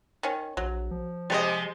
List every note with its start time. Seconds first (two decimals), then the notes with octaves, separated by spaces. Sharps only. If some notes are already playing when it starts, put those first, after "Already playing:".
0.23 D#3 C#4
0.57 A#1 F#3
0.91 F3
1.30 C3 G3 G#3 B4 D#5